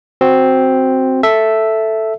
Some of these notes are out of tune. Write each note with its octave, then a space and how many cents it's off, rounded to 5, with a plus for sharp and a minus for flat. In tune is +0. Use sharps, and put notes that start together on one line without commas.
C4 +0 F#4 +0
A4 +0 E5 +0